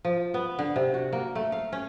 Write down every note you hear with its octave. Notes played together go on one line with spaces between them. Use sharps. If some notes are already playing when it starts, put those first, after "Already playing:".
F3
B3
D3
C3
F#4
A#3
A3
F5
C#4